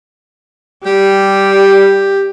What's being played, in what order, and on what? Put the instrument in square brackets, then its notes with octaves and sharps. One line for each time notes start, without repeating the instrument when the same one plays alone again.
[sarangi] G3 [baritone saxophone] G4